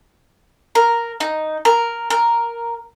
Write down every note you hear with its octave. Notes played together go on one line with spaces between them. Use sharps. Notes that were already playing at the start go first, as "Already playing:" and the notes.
A#4
D#4
A#4
A#4